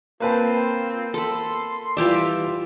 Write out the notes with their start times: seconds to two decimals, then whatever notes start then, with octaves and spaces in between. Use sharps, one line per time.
0.20 A#3 C4 F4 B4 A5
1.14 A4 B5 C6
1.97 E3 G3 F4 G4 D5 E5